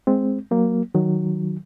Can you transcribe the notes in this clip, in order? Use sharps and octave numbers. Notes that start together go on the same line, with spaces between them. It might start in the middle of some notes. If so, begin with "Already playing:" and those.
G#3 C4
F#3 A#3
D#3 F#3